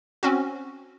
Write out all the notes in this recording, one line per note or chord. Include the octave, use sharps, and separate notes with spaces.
C4 C#4 F#4